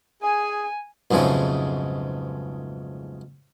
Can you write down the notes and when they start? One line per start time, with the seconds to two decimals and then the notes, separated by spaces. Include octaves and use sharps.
0.23 G#4 G#5
1.11 B1 F2 G#2 C#3 G#3 A3